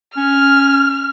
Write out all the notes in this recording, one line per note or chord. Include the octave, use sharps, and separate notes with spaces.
C#4 F6